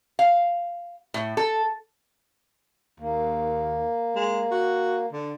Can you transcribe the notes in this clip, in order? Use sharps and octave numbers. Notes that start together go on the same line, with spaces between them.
F5
A2
A4
D#2 A#3
G#3
F#4
D3